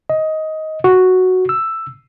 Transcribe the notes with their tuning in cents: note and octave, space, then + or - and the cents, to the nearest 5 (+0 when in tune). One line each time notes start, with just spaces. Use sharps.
D#5 +15
F#4 +0
E6 +5